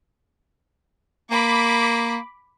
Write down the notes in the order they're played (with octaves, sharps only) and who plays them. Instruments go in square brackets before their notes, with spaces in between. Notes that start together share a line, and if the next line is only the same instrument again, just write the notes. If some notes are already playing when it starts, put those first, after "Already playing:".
[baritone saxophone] A#3 [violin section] B5 D6